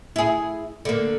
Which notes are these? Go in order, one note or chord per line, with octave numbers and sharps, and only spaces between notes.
E4 G#4
D3 A#3